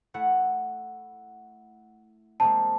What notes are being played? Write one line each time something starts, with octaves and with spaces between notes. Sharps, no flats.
A3 E4 F#5
G#3 A#3 C4 A5